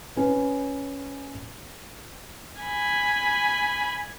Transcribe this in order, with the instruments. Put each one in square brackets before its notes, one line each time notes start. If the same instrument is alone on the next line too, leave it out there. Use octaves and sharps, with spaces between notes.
[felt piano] C#4 B4
[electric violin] G#5 B5